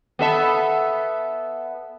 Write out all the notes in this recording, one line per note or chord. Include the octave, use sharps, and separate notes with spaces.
B3 A4 E5